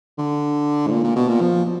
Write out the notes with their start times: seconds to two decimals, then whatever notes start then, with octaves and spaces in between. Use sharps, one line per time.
0.18 D3
0.87 G#2
0.91 A#2
1.04 A#2
1.16 B2
1.28 A#2
1.41 F3